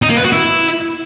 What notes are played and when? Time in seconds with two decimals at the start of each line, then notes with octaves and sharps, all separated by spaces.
0.02 D#4
0.10 A#3
0.17 B4
0.24 F#4
0.32 E4